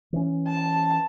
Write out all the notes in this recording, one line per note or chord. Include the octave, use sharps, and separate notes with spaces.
E3 C#4
A5